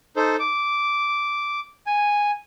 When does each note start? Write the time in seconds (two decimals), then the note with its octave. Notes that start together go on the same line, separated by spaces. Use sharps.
0.16 D#4 A4 C5
0.40 D6
1.87 G#5